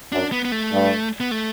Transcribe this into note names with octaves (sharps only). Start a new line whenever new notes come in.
F#2 D4
B3
B3
A3
G2
B3
A3